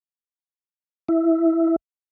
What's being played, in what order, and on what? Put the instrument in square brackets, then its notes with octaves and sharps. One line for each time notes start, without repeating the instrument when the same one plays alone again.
[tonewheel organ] E4